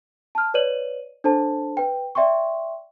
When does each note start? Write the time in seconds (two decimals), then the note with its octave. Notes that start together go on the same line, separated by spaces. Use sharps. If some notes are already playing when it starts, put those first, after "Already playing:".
0.35 A5 F6
0.54 B4 C#5 D5 D#7 F#7
1.24 D4 A4 C5 A5
1.77 B4 G5
2.15 D5 E5 G5 C6 C#6